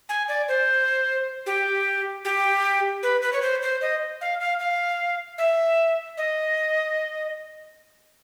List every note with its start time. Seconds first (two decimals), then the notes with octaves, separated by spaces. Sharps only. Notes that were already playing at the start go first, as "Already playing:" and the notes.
0.09 G#5
0.28 D5
0.48 C5
1.46 G4
2.25 G4
3.03 B4
3.22 B4
3.33 C#5
3.42 C5
3.63 C5
3.81 D#5
4.21 F5
4.40 F5
4.60 F5
5.38 E5
6.17 D#5